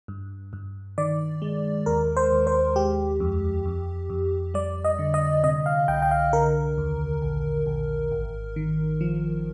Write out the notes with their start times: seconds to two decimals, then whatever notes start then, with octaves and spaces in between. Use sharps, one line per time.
0.08 G2
0.53 G2
0.98 D#3 D5
1.42 G#3
1.86 D#2 A#4
2.17 C5
2.32 D#2
2.47 C5
2.76 G#3 G4
3.20 F2
3.66 F2
4.10 F2
4.54 G3 D5
4.85 D#5
4.99 D3
5.14 D#5
5.44 C3 D#5
5.66 F5
5.88 C2 G5
6.02 G5
6.11 F5
6.33 D3 A#4
6.78 D#2
7.22 A#1
7.66 A#1
8.12 G#1
8.56 D#3
9.01 F3